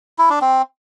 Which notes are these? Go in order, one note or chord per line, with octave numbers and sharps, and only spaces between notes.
E4
D4
C4